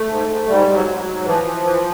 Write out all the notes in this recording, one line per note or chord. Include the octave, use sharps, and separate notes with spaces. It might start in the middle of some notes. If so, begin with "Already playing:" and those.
Already playing: A3
G#2
G#2
G#2 G3
G#2
F#3
G#2
F#3
G#2
E3 F3
E3
E3